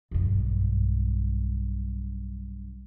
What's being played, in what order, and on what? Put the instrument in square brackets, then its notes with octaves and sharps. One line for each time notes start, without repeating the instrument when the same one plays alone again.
[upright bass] B1 G2